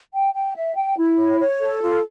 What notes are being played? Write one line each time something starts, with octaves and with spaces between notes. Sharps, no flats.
G5
G5
E5
G5
E4
C#5
C#5
A4
F4